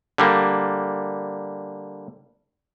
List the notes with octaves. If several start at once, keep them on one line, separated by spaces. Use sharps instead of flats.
D3 G3 A#3